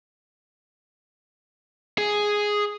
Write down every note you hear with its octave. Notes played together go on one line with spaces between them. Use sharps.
G#4